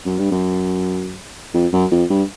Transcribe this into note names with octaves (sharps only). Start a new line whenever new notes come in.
F#2
G2
F#2
F2
F#2
F2
G2